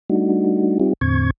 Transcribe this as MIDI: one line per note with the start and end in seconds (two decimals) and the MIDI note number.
0.10 0.78 55
0.10 0.78 57
0.10 0.78 62
0.10 0.78 63
0.10 0.78 66
0.80 0.93 55
0.80 0.93 60
0.80 0.93 63
0.80 0.93 65
0.80 0.93 67
1.01 1.30 40
1.01 1.30 45
1.01 1.30 50
1.01 1.30 60
1.01 1.30 85
1.01 1.30 92